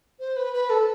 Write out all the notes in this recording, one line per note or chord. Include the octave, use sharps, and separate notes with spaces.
C5
B4
B4
A4